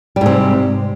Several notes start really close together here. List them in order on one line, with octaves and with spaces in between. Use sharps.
G3 G#2 C3